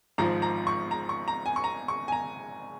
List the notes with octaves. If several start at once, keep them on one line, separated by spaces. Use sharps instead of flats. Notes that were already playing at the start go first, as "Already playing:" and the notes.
G#1 G#2 F3 A#5
A#5
C#6
A#5
C#6
A#5
G#5
C#6
A#5
C#6
G#5
A#5